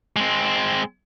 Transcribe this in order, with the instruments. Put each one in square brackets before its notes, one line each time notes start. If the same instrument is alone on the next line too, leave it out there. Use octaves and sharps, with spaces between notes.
[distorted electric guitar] G#3 C4